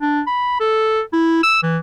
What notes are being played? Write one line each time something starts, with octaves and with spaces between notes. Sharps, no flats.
D4
B5
A4
E4
E6
E3